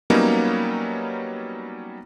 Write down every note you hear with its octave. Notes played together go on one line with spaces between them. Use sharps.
F#3 G3 A#3 B3 C#4 D#4